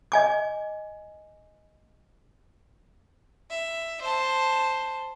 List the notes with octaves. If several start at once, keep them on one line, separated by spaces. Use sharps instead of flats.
D#5 G#5 D6
E5
C5 A5